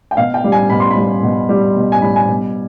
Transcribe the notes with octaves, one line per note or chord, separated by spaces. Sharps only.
G5
B2 F5
G5
G3
G#5
B2 B5
C6
B5
G3
B2
G3
B2
G#5
G3 B5
G#5
B2